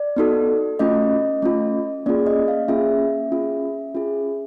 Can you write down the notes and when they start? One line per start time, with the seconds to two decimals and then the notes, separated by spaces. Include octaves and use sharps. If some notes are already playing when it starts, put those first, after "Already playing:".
Already playing: D5
0.16 B3 D#4 F#4 A4
0.79 A3 C#4 F4 D#5
1.42 A3 C#4 F4
2.06 A#3 C#4 F4 G#4 D5
2.27 D#5
2.48 F5
2.68 A#3 C#4 F4 G#4 E5
3.32 C#4 F4 G#4
3.95 C#4 F4 G#4